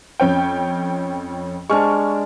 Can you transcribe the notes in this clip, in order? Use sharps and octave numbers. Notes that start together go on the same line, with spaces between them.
F2 C#4 G5
G#3 D4 C#6 F6